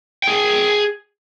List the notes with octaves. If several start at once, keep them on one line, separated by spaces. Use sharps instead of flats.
G#4 G5